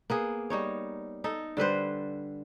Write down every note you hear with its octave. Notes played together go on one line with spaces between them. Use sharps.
A#3 B3 G#4
G3 D#4 C#5
D#4 A4
D3 G3 B4 C5